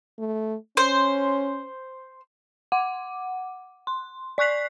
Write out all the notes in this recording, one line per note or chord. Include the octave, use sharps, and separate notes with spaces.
A3
C#4 C5
F#5 D6
C6
D5 C#6 F#6 B6 C7